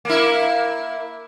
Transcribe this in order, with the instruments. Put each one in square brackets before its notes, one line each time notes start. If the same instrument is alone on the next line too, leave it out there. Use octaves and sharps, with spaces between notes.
[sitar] A#3 E4